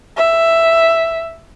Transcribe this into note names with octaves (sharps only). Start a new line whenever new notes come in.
E5